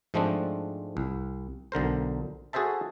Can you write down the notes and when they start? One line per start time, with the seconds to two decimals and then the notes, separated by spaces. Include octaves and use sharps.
0.14 G#2 F3 G#3 A3 C4 D4
0.97 C2
1.72 B1 D3 A#4 C5
2.53 F#4 G#4 A4 C5 E5 A5